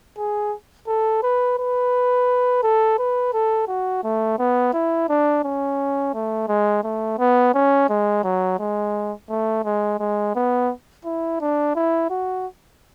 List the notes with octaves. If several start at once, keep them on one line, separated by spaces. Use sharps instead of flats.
G#4
A4
B4
B4
A4
B4
A4
F#4
A3
B3
E4
D4
C#4
A3
G#3
A3
B3
C#4
G#3
F#3
G#3
A3
G#3
G#3
B3
E4
D4
E4
F#4